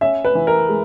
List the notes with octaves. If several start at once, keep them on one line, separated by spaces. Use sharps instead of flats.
C#4 E5
B4
E3
A#4
G#3